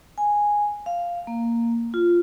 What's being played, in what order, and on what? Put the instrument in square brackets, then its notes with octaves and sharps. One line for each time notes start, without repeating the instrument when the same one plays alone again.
[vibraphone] G#5
F5
A#3
F4